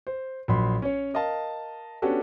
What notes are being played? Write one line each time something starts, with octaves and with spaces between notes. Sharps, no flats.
C5
A#1 F#3 B5 C6
C#4 C#5
A#4 D#5 F5 A5
B3 C#4 D4 F#4 G4 A4